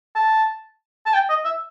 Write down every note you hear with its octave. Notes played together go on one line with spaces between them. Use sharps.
A5
A5
G5
D#5
E5